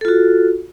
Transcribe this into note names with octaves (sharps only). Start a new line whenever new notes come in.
F4 F#4 A4